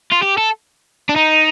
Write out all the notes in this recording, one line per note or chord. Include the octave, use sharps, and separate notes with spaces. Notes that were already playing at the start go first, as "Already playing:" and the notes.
F4
G4
A4
D4
D#4